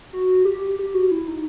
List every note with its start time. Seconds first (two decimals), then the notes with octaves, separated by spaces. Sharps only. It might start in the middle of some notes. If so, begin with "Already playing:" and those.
0.13 F#4
0.45 G4
0.79 G4
0.94 F#4
1.11 E4
1.28 D#4